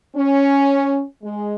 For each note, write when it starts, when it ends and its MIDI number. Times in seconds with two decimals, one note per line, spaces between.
0.16 1.03 61
1.23 1.54 56